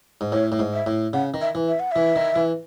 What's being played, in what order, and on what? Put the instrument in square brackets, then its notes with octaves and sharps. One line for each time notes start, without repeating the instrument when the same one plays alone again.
[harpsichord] G#2
[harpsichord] A2 [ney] C#5
[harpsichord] A2
G#2
[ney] E5
[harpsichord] A2
[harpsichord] C#3 [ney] F#5
[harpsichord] D#3
[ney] E5
[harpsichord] E3
[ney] E5
F#5
[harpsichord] E3 [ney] E5
[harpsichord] D#3
E3